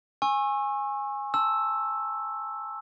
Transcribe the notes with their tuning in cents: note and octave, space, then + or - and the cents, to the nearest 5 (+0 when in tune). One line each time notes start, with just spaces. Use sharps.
G#5 -10 C#6 -35 E6 +0
A5 +0 C6 +0 E6 +0